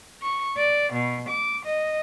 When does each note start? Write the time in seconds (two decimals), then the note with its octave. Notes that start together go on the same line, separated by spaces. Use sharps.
0.21 C#6
0.56 D5
0.93 B2
1.29 D6
1.65 D#5